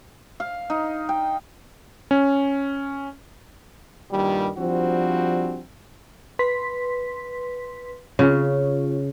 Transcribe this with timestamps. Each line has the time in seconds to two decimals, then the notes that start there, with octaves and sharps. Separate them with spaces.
0.40 F5
0.70 D#4
1.09 G5
2.11 C#4
4.11 G2 A#2 D#3 G3
4.58 F3 G3 C4 D4 F#4
6.39 B4 C6 B6
8.19 C#3 F4 C#5